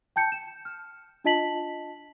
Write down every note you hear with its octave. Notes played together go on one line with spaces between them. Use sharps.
G5 A5 G6 C#7
E7
F6
D4 F4 D#5 A5 B6 F#7